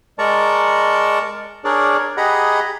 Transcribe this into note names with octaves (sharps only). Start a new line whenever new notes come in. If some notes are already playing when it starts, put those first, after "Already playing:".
G#3 A#4 D5 A5 A#5 C#6
D4 G#4 A#4 C#5 D5
G4 G#4 D#5 F#5 A#5 B5